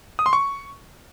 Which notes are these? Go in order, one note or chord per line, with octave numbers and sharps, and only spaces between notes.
D#6
C6
C#6